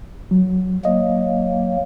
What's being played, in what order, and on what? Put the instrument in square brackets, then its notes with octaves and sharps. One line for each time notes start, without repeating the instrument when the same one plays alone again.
[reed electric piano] F#3
[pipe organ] F#3 A#3 [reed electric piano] D#5